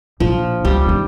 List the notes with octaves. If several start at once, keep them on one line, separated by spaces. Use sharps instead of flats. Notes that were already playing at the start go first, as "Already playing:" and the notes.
A#1 F3
C#2 G3
E2 D#4